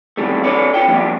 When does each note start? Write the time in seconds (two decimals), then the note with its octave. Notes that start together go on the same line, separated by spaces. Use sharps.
0.17 E2 A2 D#3 G3 A3
0.44 D4 A4 B4 C#5 D5
0.74 F4 C#5 G5
0.88 F3 G3 A#3 B3 D4